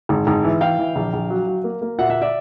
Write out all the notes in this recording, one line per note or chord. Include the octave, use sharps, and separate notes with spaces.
G#1
G#1
E3
E3 F5 G5
E3
A#1
A#1
F#3
F#3
A#3
A#3
A#2 E5 F#5
E5 F#5
D5 E5